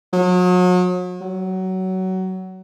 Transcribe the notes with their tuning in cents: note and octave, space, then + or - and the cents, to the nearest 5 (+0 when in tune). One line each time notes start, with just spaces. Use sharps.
F#3 -40
F#3 +20